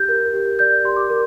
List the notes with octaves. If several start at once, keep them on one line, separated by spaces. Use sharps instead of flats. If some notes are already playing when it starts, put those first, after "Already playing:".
Already playing: G4 G6
A#4
G4
D5 G6
G4 C6
D6
A#4